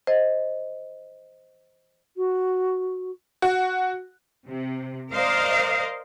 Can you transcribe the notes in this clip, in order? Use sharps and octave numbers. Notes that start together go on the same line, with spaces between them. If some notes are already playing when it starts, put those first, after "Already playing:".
C5 D#5
F#4
F#4
C3
A#4 C5 D5 D#5 F5